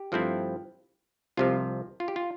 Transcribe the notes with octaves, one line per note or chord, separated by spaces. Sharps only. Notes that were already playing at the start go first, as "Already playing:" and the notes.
Already playing: G4
G2 F3 A3 C4 E4
C2 C3 F3 F4
F4
G4
F4